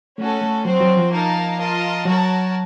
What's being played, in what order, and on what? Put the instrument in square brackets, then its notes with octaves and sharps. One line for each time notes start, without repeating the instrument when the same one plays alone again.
[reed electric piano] A3 [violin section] C#4 F#4 A4
[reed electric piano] A3
[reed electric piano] F#3 [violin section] C4 F#4 C5
[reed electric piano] F#3
F3
[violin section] A#3 D#4 A#4 F5 A5
F4 A#4 D#5 A5
[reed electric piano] F#3 [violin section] F#4 A#4 C#5 A5